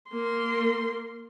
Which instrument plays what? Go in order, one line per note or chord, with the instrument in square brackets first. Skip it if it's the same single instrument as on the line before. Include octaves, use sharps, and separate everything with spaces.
[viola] A#3 C6